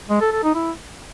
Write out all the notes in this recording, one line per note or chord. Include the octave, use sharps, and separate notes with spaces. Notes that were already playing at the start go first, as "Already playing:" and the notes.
G#3
A4
A4
D#4
E4